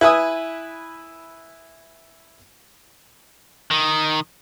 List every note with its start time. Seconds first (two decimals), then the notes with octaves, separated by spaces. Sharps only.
0.01 E4 B4 G#5 D#6 E6
3.71 D#3